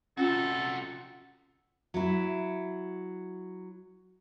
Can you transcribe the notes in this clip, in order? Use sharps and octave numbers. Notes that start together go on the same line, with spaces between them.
C3 C#4 F4 F#4 A4
F#3 E4